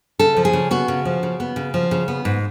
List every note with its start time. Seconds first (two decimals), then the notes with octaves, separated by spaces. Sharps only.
0.19 C#3 A4
0.37 F3
0.45 G#4
0.53 C#3
0.71 B3 F#4
0.88 C#3
1.05 F3
1.23 C#3
1.40 B3
1.56 C#3
1.74 F3
1.91 C#3
2.08 B3
2.25 G#2